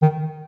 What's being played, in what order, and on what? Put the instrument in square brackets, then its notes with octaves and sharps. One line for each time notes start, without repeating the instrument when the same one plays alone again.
[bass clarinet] D#3